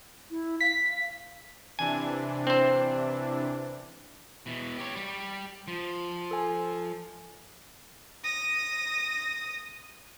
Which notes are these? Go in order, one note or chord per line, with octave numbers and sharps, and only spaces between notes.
E4
F5 B6
C3 E3 D4 G#5
C4 C5
B2 E3
G4 C#5
G3 G4
F3
A4 G#5
D#6 A#6